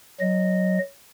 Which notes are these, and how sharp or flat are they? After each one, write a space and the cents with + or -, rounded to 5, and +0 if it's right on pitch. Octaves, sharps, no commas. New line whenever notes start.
F#3 +0 D#5 -10